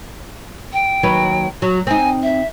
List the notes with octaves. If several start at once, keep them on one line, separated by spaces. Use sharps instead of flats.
G5
D#2 F#3 B4
F#3 F#4
C4 D#4 G#5
E5